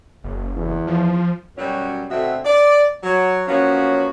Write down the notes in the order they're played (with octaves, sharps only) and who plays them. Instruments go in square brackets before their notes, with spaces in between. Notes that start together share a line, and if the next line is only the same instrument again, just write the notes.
[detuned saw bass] F#1
[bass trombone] E2
[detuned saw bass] F3
[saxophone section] F#2 B2 F#3 G3 C#4 F#4
B2 D3 A3 C4 F#4 E5
D5
F#3
F3 F#3 A#3 B3 C#4 F#4